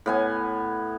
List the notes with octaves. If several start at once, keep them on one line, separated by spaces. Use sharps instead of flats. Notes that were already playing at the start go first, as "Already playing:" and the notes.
A2 B3 G#5